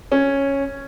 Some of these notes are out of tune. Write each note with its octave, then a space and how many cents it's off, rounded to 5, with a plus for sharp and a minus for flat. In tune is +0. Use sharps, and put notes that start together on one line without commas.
C#4 -5